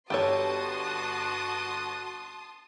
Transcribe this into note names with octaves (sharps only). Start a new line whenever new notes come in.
G1 F#4 G4 A4 C#5 A5 C6 D#6